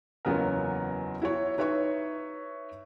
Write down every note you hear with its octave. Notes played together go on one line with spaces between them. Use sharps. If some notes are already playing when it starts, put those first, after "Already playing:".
F#1 E2 F#3 B3 F4 A#4
E4 F#4 C#5
D#4 B4 C#5 E5 C#6